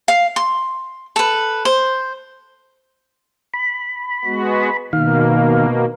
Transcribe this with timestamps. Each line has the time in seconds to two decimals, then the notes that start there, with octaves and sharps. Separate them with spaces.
0.08 F5
0.36 C6
1.16 A4 B4
1.65 C5
3.54 B5
4.25 G#3 B3 F#4
4.93 B2 D#3 A#3 F5